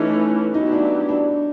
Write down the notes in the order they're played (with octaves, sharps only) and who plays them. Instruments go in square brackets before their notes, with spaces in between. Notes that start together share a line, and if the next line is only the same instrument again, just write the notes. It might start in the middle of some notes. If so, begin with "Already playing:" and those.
Already playing: [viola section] E3 A3 C#4 [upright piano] D#4
[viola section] F#3 B3 E4 G4 [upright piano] D#4
[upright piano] D4
D4